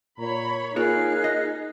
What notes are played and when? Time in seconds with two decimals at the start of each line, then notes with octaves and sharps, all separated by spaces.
0.19 A#2 C#5 A#5 B5
0.76 A#3 D#4 F4 G#4 A#4 C#5 F6 F#6
1.24 D#5